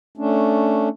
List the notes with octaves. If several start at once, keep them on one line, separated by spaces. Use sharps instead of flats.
A3 C#4 D4